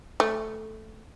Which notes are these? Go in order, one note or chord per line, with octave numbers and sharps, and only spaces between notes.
A3